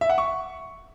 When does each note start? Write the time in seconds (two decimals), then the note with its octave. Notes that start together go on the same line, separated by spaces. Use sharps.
0.01 E5
0.10 F#5
0.18 C#6